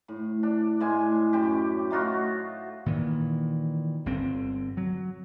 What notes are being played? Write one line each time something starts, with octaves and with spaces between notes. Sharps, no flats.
A2
D4
A2 G#3 G#5 C6
F#2 G4
A3 D#4 F4 F#4
A#2 D#3 E3
G1 D3 C4
F#3